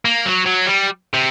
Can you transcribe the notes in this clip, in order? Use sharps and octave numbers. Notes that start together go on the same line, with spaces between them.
A#3
F#3
F#3
G3
C3